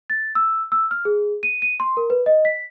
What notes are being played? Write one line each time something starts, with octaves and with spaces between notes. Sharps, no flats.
A6
E6
E6
F6
G#4
D#7
D#7
C6
A#4
B4
D#5
B6